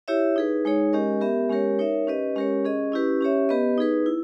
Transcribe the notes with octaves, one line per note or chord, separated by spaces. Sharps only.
E4 G4 C#5 E5
D#4 G#4 B4
G#3 D#4 G#4 C#5
G#3 C#4 G4 A#4 D#5
B3 G4 A#4 E5
G#3 C#4 G4 A#4 C#5
D#4 A#4 C#5 E5
C#4 G4 B4 D#5
G#3 C#4 G4 A#4 C#5
C#4 G#4 D#5
C#4 E4 G4 B4
C#4 G4 C#5 E5
B3 G4 B4 D#5
D#4 G#4 B4
E4